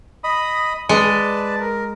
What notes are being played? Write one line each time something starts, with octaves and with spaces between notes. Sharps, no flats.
D#5 B5 D#6
G#3 B4 D5 A5
A#4